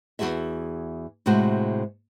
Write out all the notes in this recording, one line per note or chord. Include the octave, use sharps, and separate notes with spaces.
E2 C#3 F#4 G#4 E5
A2 C3 G#3 F#4 C5